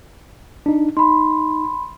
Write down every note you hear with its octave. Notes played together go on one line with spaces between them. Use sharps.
D4 D#4
D#4 B5 C6